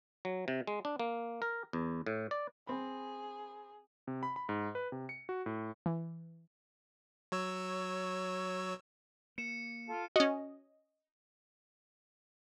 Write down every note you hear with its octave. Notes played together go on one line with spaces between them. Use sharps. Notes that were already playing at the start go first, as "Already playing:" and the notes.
F#3
C3
G#3
D4
A#3
A#4
E2
A2
D5
C4 G#4 B5
C3
B5
B5
G#2
B4
C3
C#7
F#4
A2
E3
F#3 C#5 E6
A#3 C#7 E7
F4 A4
C#4 F#4 D#5